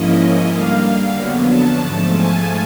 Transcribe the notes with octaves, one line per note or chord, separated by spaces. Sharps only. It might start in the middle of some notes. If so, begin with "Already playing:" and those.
Already playing: G#2 F3 A#3 C#4 E4 D#5
D3 G3 A#3 F5
F2 D3 F#3 B3
A5
G#2 F3 A3 A5
G#5